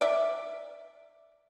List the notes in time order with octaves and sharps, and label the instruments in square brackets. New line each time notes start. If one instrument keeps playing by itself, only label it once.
[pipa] D5 E5